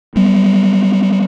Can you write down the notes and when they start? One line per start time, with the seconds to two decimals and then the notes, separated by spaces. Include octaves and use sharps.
0.16 F#3 G3 B3